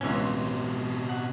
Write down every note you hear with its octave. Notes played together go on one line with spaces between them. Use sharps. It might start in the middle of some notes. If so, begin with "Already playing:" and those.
C#2 B2 E3 C4 C#4
F#5